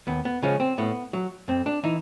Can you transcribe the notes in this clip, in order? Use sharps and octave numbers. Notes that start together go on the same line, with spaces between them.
D#2 B3
B3
C#3 F3 G#3 C#4
C4
A2 B3
F#3
F2 C4
D4
E3 D#4